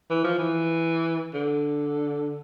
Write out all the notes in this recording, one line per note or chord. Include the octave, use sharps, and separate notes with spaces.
E3
F3
E3
D3